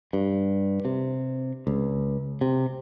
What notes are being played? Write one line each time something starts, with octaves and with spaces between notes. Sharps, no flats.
G2
C3
C#2
C3